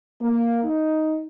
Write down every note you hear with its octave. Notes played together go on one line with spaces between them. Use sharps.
A#3
D#4